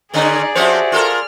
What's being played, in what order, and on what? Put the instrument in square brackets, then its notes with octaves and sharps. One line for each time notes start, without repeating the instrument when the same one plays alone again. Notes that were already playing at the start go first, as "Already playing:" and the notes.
[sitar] G#2 D3 C#4 [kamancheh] D#4 D#5 [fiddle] G#4 D5
[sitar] F3 C4 C#4 [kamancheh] F#4 G4 [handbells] C5 E5
[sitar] F4 A4 A#4 [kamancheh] F6